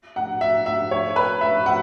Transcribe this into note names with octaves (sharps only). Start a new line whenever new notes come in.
F#5
E5
E5
C#5
B4
E5
F#5